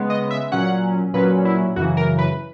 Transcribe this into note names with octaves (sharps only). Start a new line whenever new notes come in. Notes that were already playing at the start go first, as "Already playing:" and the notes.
Already playing: C#3 G#3 B3
D#5
E5
A#2 F#3 C#4 F#5
A#2 F#3 C#4 B4
E4
F#2 C#3 E3 F#4
A#4
B4